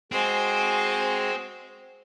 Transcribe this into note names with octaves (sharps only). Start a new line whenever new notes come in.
G#3 C4 F#4 C5 G#5